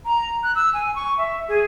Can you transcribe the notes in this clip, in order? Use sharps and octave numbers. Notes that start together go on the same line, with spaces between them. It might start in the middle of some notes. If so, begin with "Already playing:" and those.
A#5
F#6
E6
G#5
C#6
E5
G#4